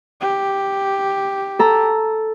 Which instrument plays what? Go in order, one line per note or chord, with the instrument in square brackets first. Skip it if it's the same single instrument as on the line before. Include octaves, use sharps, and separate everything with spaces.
[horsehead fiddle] G4
[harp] A4 A#5